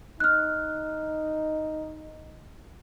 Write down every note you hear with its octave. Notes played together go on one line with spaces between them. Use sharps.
D#4 F6 F#6